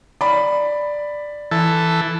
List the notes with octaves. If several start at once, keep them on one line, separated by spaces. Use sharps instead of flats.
D5 B5
E3 A4